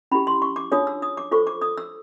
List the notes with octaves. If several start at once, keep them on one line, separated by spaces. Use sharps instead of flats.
C#4 E4 G4 B5
C6
C#6
D6
D4 F4 G#4 C#5 D#6
E6
D#6
D6
F4 A4 C5 C#6
D6
D#6
E6